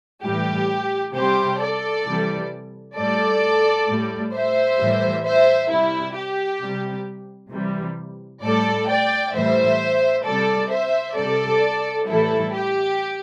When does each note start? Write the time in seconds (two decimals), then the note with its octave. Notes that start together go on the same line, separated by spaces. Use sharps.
0.24 A2 E3 G3 G4
1.15 C3 G3 G4 C5
1.60 A4 D5
2.06 C3 E3 G3
2.97 A2 G3 A4 D5
3.88 A2 G3
4.33 C5 E5
4.79 A2 E3 G3
5.24 C5 E5
5.69 C3 G3 E4
6.15 G4
6.62 C3 G3
7.52 C3 E3 G3
8.43 A2 G3 A4 D5
8.88 D5 G5
9.34 A2 E3 G3 C5 E5
10.24 C3 G3 A4 D5
10.70 C5 E5
11.16 C3 G3 A4 D5
12.06 A2 E3 G3 E4 A4
12.53 G4